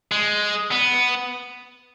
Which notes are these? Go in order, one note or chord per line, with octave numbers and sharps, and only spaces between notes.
G#3
B3